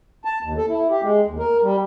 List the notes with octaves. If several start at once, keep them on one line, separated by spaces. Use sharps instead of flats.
A5
D#2
A4
E4
G4
G#3
D#2
A#4
G3